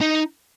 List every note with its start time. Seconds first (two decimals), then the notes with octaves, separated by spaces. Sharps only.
0.01 D#4